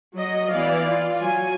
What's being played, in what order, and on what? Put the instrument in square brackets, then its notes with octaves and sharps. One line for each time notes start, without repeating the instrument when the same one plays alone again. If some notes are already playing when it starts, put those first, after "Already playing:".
[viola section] F#3 D#5
E3 B3 D5 F5
F4
F#3 G#5